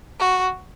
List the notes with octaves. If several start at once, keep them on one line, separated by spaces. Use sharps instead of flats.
F#4